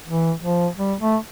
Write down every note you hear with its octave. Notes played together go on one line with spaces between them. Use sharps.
E3
F3
G3
A3